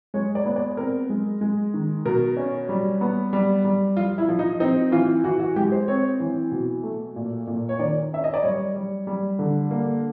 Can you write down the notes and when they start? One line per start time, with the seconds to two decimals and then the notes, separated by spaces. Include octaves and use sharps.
0.14 G#3 C#5
0.35 D5
0.46 B3
0.56 D5
0.77 C4 A#4
1.10 G#3
1.41 G#3
1.74 D#3
2.06 B2 A#4
2.37 C#4
2.69 G3
3.01 B3
3.33 G3
3.65 G3
3.97 F3 F4
4.18 E4
4.29 F3
4.39 D#4
4.60 C4 D#4
4.92 E3 F4
5.24 E3 F#4
5.40 F#4
5.56 G#3 G4
5.72 C5
5.88 C4 C#5
6.20 E3
6.52 B2
6.83 A3
7.16 A#2
7.47 A#2
7.69 C#5
7.79 D#3 D5
8.12 C#4 E5
8.24 D#5
8.34 D5
8.43 G3 C#5
8.75 G3
9.07 G3
9.39 D3
9.71 A#3